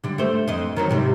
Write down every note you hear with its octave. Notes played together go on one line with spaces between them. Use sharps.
D3 G3
A3 C5
F2 C5 D#5
D#3 F#3 C4
G#2 C3 G3